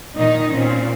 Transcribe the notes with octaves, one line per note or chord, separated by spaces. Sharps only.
A#2 D#3 D#4
A#2 C4 C#4